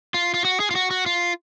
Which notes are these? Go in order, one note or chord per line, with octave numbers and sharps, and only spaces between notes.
F4
F4
F#4
G#4
F4
F#4
F#4
F4